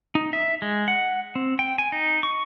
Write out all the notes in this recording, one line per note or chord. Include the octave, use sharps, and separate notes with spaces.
D#4
E5
G#3
F#5
C4
G5
G#5
D#4
C#6